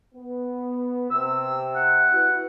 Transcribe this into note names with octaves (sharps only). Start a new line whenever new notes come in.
B3
C3 E6
F#5
E4 F#4 B4